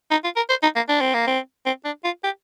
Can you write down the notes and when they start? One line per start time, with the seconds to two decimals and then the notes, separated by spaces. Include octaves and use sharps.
0.11 D#4
0.24 F4
0.36 A#4
0.49 C5
0.63 D#4
0.76 A#3
0.89 D4
1.01 C4
1.14 A#3
1.27 C4
1.66 C4
1.85 D4
2.04 F4
2.24 G4